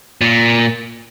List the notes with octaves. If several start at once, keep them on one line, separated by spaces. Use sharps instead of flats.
A#2